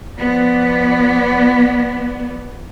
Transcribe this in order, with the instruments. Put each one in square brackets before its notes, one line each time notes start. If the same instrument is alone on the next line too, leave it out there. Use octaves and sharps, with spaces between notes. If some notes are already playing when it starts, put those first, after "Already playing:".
[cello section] F3 B3 D5